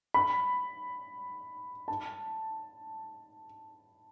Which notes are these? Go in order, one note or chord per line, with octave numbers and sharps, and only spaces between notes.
B5
A5